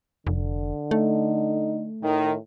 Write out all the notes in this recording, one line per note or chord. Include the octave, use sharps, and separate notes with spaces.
F1 D3
A3 D#4
A2 D#3